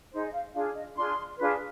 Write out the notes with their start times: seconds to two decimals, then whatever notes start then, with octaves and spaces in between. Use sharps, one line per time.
0.11 D#4 G#4 C5
0.25 D#5
0.32 F5
0.53 D4 F4 G#4 F5
0.74 D#5
0.95 D4 F4 G#4 C6
1.37 D4 F4 G#4 B4